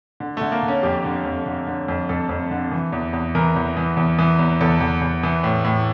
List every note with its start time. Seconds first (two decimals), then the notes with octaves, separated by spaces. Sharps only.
0.20 D3
0.37 D3 A3
0.52 A#3
0.63 D3
0.68 C#4
0.83 F2 G4
1.05 D3
1.25 F2
1.46 D3
1.67 D3
1.88 F2
2.09 F2 A4
2.29 F2
2.51 D3
2.71 E3
2.93 E2
3.13 E2
3.35 E3 A#4
3.56 E2
3.77 E3
3.97 E2
4.19 E3
4.39 E2
4.61 E2 A4
4.80 E2
5.01 E2
5.23 E3
5.44 A2
5.64 A2